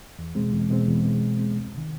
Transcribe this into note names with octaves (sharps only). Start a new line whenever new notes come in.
E2
B2 G#3 C4
E2
B2 G#3 C4
E2
B2 G#3 C4
E2
B2 G#3 C4
C#2
C3 D#3